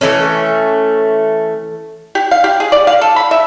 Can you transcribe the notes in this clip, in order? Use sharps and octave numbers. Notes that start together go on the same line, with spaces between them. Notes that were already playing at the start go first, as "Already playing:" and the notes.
E3 F#3 A3 C#4
G4
F5
G4
G#4
D5
F5
A4
B5
E5